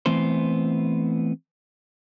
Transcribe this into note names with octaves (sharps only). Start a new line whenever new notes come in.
E3 A3 B3 C4 E4 C5